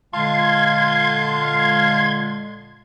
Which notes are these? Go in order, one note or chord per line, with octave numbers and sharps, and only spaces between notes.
A#2 D3 G#3 F4 F5 A5 C6 G#6